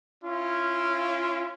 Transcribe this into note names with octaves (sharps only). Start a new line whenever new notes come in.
C#4 E4 F4 F5